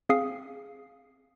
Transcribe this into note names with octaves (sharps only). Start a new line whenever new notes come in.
C4 G#4 F5 D#6 C7